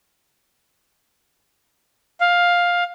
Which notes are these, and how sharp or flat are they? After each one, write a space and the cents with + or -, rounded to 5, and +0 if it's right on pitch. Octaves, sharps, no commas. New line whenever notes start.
F5 +10